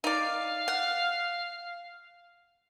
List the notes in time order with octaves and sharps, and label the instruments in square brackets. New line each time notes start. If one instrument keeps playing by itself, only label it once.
[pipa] D#4 D5 [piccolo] F5
[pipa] F#5